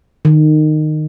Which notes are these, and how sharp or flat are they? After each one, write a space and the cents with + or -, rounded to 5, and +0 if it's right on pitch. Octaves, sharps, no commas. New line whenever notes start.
D#3 -20